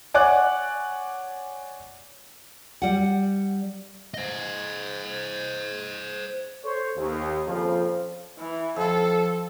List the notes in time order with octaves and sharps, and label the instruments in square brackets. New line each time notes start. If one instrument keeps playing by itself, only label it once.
[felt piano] C#5 D5 F#5 G#5 D6 F#6
[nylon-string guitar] G3 F#5
[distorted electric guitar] C5 D#5
[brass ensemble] A4 C5 C#5
D#2
F2 A#2 C#3 F3
[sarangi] E3
[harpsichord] F2 F4 [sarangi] A4